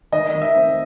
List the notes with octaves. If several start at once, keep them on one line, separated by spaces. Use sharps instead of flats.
D#3 D#5
D#3
E5
C4